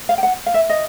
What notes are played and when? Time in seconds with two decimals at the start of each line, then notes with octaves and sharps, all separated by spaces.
0.09 F5
0.18 G5
0.23 F#5
0.46 F5
0.54 E5
0.69 D#5